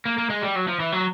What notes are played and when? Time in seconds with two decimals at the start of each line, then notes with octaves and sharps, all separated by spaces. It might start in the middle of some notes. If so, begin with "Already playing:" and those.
0.05 A#3
0.18 A#3
0.30 G#3
0.42 G3
0.56 F#3
0.68 F3
0.80 E3
0.92 F#3